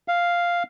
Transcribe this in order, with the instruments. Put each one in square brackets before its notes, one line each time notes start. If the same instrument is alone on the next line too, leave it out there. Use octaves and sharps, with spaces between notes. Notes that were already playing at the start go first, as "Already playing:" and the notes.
[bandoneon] F5